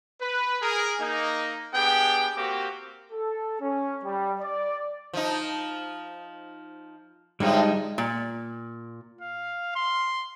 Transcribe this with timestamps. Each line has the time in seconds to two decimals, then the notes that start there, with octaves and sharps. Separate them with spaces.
0.21 B4
0.62 G#4 A#4
1.00 A#3 D#4
1.74 B3 D4 G4 G#4 G5
2.37 A#3 C4 F#4 G4
3.12 A4
3.62 C#4
4.04 G3
4.41 D5
5.13 F3 D#4
7.40 A2 D3 F3 G3 G#3 D#4
7.98 A#2
9.21 F5
9.75 C6